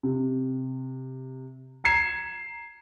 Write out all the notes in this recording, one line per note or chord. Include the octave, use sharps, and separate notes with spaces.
C3
A#5 G#6 C7 E7